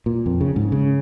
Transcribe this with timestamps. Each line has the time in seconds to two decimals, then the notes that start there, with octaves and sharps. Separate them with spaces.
0.06 A#2
0.26 F2
0.41 C#3
0.56 G#2
0.72 C#3